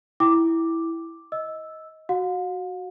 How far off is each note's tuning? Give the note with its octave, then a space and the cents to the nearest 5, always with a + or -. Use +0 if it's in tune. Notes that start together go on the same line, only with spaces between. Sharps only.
E4 +0 G5 +0 D6 +0
D#5 +20 E6 +0
F#4 +0 F5 +45